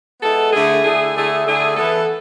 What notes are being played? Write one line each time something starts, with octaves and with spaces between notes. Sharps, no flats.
G#3 B3 E4 A4
D3 A3 E4 G#4
D3 A3 E4 G#4
D3 A3 E4 G#4
D3 A3 E4 G#4
E3 B3 E4 A4